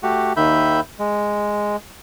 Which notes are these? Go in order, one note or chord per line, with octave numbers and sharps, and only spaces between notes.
A3 F#4 G4
D#2 D#3 E5 B5 G6
G#3